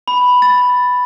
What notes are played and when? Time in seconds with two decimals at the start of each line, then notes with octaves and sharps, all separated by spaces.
0.08 B5
0.42 A6